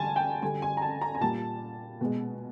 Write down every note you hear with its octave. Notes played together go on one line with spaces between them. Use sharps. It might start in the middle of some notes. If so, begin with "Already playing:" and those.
Already playing: D3 G3 G#5 A5
G5
D3 G3 G#5
G#5
A#5
A5
A#5
G#5
A#2 G3 A5
B2 G#3